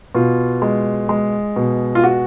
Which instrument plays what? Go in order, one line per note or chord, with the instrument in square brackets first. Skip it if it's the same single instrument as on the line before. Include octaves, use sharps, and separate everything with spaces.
[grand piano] B2 F4
G#3
G#3
B2
F4
F#4